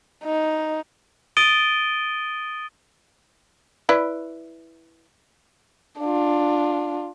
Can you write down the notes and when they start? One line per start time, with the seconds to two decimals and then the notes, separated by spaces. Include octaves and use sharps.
0.24 D#4
1.37 D#6 A6 D7 D#7 G7
3.89 E4 B4 D5
6.00 D4 F4